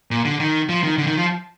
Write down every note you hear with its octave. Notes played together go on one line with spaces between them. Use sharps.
A#2
D3
D#3
F3
D#3
D3
D#3
F3